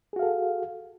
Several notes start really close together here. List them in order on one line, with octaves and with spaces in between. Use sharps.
G#4 F#4 F5 A4